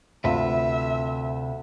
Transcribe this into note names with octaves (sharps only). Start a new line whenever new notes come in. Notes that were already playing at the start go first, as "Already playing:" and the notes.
D2 C3 F4 B4 E5